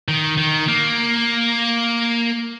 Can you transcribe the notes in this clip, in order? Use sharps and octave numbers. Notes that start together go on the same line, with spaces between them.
D#3
D#3
A#3